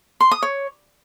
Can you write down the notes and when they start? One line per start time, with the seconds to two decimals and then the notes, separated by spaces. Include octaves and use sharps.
0.21 C6
0.32 D#6
0.43 C#5